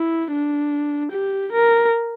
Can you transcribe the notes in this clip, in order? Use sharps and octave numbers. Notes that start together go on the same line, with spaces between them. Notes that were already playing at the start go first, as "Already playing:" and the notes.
Already playing: E4
D4
G4
A#4